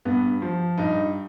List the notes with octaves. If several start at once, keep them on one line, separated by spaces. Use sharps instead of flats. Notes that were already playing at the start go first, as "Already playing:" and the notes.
G2 B3
F3
G2 D#4